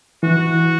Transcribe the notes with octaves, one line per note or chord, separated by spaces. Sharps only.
E3 F#4